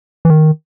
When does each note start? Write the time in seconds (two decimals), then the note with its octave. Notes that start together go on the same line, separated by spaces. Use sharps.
0.25 E3
0.30 D#3